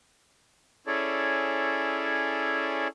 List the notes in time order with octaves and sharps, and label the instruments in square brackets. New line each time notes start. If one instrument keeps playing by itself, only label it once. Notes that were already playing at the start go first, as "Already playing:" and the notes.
[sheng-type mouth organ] C#4 E4 G#4 A4 C#5 D5